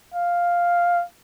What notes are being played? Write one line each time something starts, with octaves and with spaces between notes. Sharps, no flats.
F5